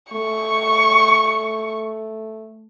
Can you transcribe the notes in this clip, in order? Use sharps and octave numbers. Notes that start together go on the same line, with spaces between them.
A3 C#6